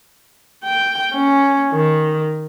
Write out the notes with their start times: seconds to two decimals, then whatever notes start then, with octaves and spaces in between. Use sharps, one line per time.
0.64 G5
1.13 C#4
1.73 D#3